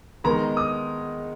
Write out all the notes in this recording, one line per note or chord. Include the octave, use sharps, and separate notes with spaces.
D#3 G#3 B3 A#5
D#6